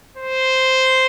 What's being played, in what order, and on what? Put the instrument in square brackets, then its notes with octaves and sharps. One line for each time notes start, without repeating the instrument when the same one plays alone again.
[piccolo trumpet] C5